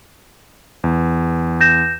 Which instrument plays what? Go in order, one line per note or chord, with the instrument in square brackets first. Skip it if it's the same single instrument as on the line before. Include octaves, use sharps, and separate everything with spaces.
[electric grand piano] E2
[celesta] G6 A#6 E7